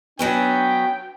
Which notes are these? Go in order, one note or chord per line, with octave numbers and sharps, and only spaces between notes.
F#3 B3 C#4 D4 G5